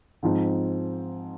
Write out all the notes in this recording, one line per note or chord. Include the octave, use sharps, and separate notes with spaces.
G#2 F3 C4 D#4